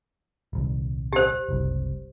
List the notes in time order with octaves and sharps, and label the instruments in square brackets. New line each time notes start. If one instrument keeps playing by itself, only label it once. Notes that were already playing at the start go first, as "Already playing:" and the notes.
[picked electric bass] D#1 C2
[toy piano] G4 C5
[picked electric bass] F#1 C2